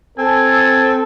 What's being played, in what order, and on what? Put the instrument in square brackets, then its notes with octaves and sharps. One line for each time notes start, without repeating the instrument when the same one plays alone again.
[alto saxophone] C4 [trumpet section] A4 [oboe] G#5